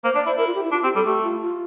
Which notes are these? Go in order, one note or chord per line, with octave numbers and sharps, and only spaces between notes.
A#3 C5
D4 D5
E4 C5
E4 A#4
F4
G4
E4
D4 F4
C4 G4
G3 A4
A3 G4
F4
F4